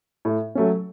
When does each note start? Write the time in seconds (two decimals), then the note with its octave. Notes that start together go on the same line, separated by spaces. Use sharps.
0.25 A2
0.55 F#3 A3 C#4